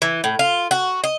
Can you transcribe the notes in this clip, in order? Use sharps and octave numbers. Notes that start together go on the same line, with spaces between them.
E3
A2
F4
F#4
D#5